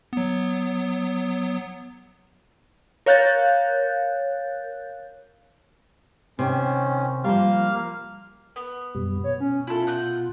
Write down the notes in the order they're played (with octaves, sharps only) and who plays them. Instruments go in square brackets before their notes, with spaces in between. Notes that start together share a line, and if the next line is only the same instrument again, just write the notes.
[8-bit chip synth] F#3 B3
[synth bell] A#4 C#5 F5 F#6 G6 A6
[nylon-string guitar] C3 [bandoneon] D#3 C#4
[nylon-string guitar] F3 G3 [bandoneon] A#3 F5 F6
[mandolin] B3
[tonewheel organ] F#2 B2 G3
[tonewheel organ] B2 [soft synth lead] C#5
[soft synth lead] C#4
[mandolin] E4 A4 [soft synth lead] F4
[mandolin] F#5 F#6 G6